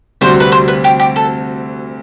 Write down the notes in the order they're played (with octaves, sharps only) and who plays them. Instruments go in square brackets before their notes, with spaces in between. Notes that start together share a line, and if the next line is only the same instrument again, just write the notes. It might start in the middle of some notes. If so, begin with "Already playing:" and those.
[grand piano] D2 C3 G3 C4 F#4 [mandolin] C5
[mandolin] B4
C5
B4
G4
G4
A4